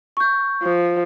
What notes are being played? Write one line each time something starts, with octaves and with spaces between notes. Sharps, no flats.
C#6 G6
F3